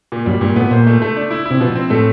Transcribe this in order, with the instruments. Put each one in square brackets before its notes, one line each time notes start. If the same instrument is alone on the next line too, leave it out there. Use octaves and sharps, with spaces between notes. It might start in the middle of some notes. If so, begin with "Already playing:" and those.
[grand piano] A#2
[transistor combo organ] F#2 [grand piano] G3
[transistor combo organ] G2 [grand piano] A#2
[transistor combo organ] A2 [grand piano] B3
[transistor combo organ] A#2 [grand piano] C5
[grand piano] A3
A3
D4
E4
E4
[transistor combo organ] C3
[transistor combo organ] B2 [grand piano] F3
[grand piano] C4
[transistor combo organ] A2 [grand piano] A3